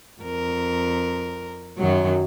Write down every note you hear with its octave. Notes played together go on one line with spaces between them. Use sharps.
F2 A#4
F#2 D#3 F#3